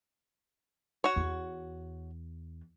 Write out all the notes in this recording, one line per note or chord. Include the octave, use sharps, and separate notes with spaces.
F#4 C#5
E2